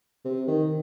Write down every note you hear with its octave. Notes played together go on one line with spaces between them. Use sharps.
C3
D#3